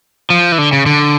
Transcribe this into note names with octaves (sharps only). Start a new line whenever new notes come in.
F3
E3
D3
C#3
D3